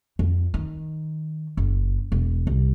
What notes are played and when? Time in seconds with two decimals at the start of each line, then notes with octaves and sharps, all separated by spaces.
0.19 F2
0.54 D#3
1.57 F#1
2.12 E1
2.47 C2